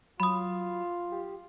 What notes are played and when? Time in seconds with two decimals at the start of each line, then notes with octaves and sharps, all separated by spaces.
0.20 F#3 F4 B5 D#6
1.12 G4